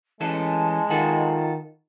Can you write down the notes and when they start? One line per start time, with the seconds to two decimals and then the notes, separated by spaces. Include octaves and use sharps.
0.21 E3 G#3 C#4 A4 A5
0.90 D#3 F4 A4 F#5